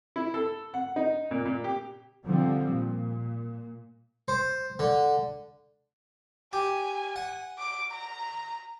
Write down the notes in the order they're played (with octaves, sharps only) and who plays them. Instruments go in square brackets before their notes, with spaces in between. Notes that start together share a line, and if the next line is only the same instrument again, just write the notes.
[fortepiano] E4
A4
F#5
D#4
A#2
A#2
G4
[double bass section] D3 F3 G3 C4
A#2
[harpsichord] C5
D3
[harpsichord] G4 [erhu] G#5
[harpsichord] F#5
[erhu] D6
A#5